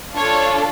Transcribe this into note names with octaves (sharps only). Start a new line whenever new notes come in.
D4 F4 A4 C#5